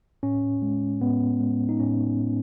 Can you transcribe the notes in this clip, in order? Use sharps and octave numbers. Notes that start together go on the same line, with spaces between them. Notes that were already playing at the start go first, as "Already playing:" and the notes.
A2 C#4
G#3
A2 B3
G#3
D#4
A2 C#4
G#3